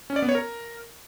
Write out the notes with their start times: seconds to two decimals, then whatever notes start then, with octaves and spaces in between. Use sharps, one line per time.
0.10 C#4
0.16 D5
0.22 B3
0.29 C#5
0.35 A#4